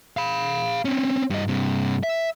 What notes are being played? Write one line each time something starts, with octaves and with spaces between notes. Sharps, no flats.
F5 B5
C4 C#4
G2 D#5
G2 C3
E5